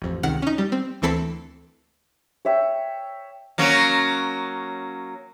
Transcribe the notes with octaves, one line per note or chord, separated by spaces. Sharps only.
A1 F2
C#2 C3 D#3 F#5 F6
C#4 D#4
G3
C4
D2 E3 C4 A4 B5 C7
C#5 E5 G5
F#3 A#3 C#4